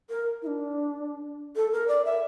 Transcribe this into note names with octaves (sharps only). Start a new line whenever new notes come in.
A#4
E4
D4
A4
A#4
D5
E5